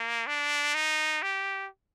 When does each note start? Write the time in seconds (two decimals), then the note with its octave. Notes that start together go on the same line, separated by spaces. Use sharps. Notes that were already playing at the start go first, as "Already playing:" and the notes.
Already playing: A#3
0.27 D4
0.75 D#4
1.23 G4